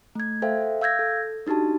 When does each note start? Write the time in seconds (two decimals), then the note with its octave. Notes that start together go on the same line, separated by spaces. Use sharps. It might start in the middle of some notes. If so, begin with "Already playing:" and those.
0.15 A3 G#6
0.42 A4 C5 E5 F5 G5
0.81 F5 E6 G6 G#6 A#6
0.99 A4
1.47 D4 D#4 F#4 G4 A5